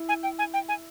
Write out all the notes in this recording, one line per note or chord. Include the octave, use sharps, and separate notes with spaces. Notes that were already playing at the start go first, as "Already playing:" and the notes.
Already playing: E4
G#5
G5
G#5
G5
G#5